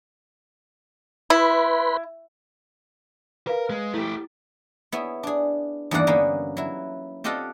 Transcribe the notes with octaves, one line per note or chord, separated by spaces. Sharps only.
E4 B4 B5 C6
A#4 B4 F5
G#3
A3 E4 G4
B3 E4 G#4 C#5
D4 G#4
E2 G2 D#3 A#3 D5 F#5
D3 A#3 B3 C#4 D#4
F#3 E4
C4 F4 G4 A4 D#5 F#5